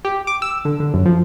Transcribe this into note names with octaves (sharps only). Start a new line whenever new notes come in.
G4
D6
E6
D3
D3
F#2
F3